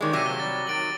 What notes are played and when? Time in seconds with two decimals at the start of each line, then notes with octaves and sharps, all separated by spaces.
0.01 D#3 G#3 G4 C#5 D5
0.13 C3 F#3 D6 A#6 D#7
0.26 F3 A#3 G7
0.40 G3 A6
0.67 D#3 F#3 A6 D7 F#7